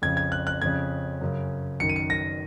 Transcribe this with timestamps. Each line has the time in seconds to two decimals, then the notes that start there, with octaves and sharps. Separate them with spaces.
0.02 F2 C#3 G#6
0.17 G#6
0.32 F#6
0.47 F#6
0.62 F2 C#3 G#6
1.21 F#2 C#3
1.80 F#2 D#3 C#7
1.89 D#7
1.96 C#7
2.10 A#6